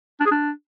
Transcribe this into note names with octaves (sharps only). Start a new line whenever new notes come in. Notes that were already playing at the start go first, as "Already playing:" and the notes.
D4
G#4
D4